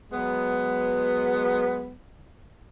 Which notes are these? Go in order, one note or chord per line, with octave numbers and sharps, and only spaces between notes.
F#3 G#3 B3